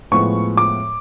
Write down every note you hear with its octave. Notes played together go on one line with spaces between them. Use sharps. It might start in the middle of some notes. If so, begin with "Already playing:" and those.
A2 F3 G#3 B3 C#6
D6